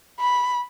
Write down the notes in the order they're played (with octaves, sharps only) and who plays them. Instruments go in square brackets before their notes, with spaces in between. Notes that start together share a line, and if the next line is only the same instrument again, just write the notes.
[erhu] B5